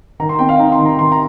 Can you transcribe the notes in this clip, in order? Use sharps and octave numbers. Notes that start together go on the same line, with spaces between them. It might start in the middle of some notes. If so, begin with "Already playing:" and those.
D#3 A#5
C6
C4 G5
F5
D#4 A#5
C6
D#3
A#5
D#3 C6
A#5